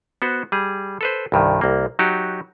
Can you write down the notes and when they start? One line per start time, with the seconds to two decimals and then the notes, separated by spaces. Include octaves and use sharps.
0.22 B3 F#4 C5
0.52 G3 G#4
1.01 A4 B4 C5
1.32 C2 G2 D#3
1.61 C2 A#3
1.99 F#3 D#4 F#4 G4